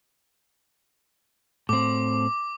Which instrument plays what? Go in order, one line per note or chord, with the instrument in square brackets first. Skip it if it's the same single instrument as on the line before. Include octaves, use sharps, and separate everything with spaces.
[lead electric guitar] A2 C4 [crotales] D6